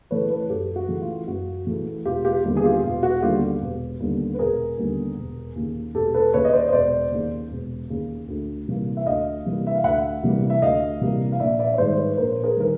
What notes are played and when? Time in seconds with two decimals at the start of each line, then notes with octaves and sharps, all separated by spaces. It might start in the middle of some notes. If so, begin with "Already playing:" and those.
0.11 C#3 E3 A3 B4 C#5
0.30 A4 B4
0.50 F#2 G4 A4
0.76 F#4
0.88 C#3 E3 A3
1.02 F4
1.28 F#2 F#4
1.67 C#3 E3 A3
2.05 E1 F4 G4
2.25 F4 G4
2.44 D#2 D3 G3 B3
2.57 G#4
2.64 F4 G4
2.84 E1 F4
3.03 F#4
3.22 D#2 D3 G3 B3 F4 G4
3.62 E1
4.00 D#2 D3 G3 B3
4.34 B4
4.39 E1 G#4 A#4
4.78 D#2 D3 G3 B3
5.17 E1
5.55 D#2 C#3
5.95 E1 G4 A4
6.14 A4 B4
6.33 D#2 C#3 B4 C#5
6.45 D#5
6.53 C5 D5
6.69 D#5
6.72 E1 C5 D5
7.11 D#2 C#3
7.51 E1
7.89 D#2 C#3
8.28 D2
8.68 C3 E3 G3 A#3
8.97 E5
9.06 D2 D#5 F5
9.45 C3 E3 G3 A#3
9.67 E5
9.76 F5
9.83 D2 E5 F#5
10.23 C3 E3 G3 A#3
10.50 E5
10.62 D2 D#5 F5
11.01 C3 E3 G3 A#3
11.32 F5
11.40 A#1 D5 E5
11.59 D5 E5
11.74 C#5
11.78 G#2 D#3 G3 C5 D5
11.98 B4 C#5
12.17 A#1 A#4 C5
12.43 G#4 A#4
12.57 D#3 G3 A#4